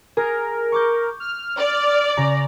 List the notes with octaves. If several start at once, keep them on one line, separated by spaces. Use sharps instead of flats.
G#4 A#4
C#6 D6 G6
F6
D5
C#3 A#5